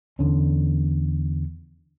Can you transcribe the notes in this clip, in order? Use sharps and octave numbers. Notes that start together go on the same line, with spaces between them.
E2 D3 C#4